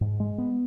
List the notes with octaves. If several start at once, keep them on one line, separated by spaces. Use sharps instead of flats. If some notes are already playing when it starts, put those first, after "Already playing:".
G#2
G#3
B3